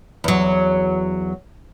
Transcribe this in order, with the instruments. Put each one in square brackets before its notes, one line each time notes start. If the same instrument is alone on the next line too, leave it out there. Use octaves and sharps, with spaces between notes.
[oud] E2 F#3